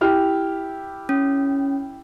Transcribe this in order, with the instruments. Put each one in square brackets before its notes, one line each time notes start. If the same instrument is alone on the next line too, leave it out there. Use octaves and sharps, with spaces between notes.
[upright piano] E4 G4 F6
[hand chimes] C#4